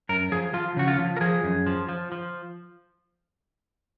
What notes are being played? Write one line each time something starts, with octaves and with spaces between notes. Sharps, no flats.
F#2 A#4
F3 G#4
F3 F4
C#3 F#4
F4
F3
A#4
F3 G#4
F#2
F3
F3
F3